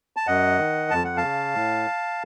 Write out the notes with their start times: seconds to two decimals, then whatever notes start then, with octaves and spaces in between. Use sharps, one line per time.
0.16 A5
0.27 F#2 D#5 F#5
0.59 D#3
0.90 F2 A5
1.04 F#5
1.17 F5 A5
1.23 C#3
1.55 A2